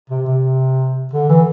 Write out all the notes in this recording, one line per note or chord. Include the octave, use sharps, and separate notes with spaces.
C3
C3
D3
E3